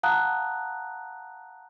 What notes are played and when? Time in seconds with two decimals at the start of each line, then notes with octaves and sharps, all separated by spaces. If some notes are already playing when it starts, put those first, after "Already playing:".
0.03 F5 F#5 A5 A#5 D#6 F#6